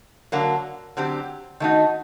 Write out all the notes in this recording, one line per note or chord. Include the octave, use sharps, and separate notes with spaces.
D3 F#3 A#3 F#4
D3 F#3 C4 G4
D#3 A3 D#4 F#4